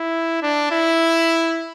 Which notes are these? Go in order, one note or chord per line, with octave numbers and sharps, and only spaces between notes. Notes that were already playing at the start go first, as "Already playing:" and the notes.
Already playing: E4
D4
E4